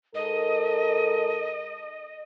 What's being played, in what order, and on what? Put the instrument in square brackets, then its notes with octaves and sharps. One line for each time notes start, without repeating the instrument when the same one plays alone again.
[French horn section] G#2 A4 A#4 [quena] D#5